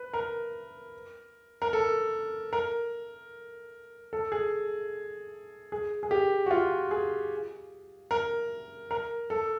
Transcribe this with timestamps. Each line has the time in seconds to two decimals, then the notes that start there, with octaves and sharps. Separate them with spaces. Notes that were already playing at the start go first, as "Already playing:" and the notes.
Already playing: B4
0.14 A#4
1.62 A#4
1.73 A4
2.53 A#4
4.13 A4
4.32 G#4
5.72 G#4
6.03 G#4
6.11 G4
6.46 F#4
6.51 F4
6.91 G#4
8.11 A#4
8.91 A#4
9.30 A4